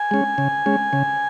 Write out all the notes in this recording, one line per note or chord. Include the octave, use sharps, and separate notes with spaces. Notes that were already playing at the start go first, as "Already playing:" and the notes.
Already playing: G#5
G#3 C#4
C#3
G#3 C#4
C#3